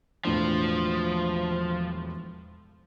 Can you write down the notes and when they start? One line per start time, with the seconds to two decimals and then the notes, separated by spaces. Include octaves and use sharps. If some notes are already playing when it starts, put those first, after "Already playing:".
0.25 E1 A2 F3 D4